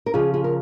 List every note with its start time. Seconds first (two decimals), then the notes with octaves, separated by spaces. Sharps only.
0.06 A#4
0.14 C#3 F3 F4 G#4
0.34 F4 G#4
0.44 A#4